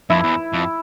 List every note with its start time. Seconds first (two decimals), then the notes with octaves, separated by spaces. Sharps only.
0.10 F2 E4
0.24 E2
0.54 F2